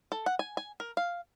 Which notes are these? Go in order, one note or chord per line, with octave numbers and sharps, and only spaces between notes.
A4
F#5
G#5
G#5
A#4
F5